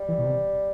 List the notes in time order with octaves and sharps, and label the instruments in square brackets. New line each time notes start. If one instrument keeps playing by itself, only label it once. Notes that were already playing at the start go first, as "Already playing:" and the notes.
Already playing: [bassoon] G3
[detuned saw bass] E3
B2
C3